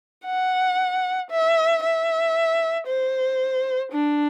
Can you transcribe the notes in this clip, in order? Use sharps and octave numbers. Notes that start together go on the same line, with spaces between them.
F#5
E5
E5
C5
D4